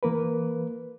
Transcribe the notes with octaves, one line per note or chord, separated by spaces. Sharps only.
E3 A#3 A#4 B4